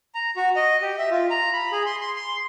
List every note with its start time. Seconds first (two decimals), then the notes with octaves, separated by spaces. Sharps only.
0.15 A#5
0.37 F#4
0.56 D#5
0.82 G4
0.99 E5
1.11 F4
1.30 A#5
1.53 B5
1.72 G#4
1.86 C6
2.01 C6
2.16 C6